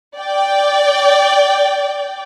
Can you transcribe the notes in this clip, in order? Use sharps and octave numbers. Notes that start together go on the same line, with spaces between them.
D5 G5